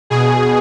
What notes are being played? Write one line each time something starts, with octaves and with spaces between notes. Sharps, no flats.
B2 G#4